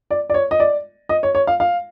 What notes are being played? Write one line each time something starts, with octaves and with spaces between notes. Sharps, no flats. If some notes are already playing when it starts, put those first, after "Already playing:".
D5
D5
C#5
D#5
D5
D#5
C#5
C#5
F5
F5